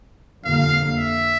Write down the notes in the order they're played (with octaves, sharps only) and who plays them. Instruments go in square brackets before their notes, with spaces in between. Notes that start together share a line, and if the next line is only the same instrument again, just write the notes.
[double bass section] F2 D3 G3 A#3 [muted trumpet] F5
[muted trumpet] E5